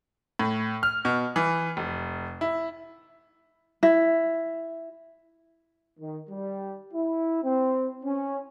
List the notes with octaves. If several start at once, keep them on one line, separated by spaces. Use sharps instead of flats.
A2
F6
B2
E3
F1
E4
E4
D#3
G3
E4
C4
C#4